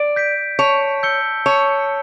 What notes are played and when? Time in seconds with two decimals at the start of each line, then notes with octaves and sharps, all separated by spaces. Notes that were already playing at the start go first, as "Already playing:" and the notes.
Already playing: D5
0.16 G6 B6 D7
0.59 C#5 A5
1.03 E6 G6 C#7 G7
1.46 C#5 A5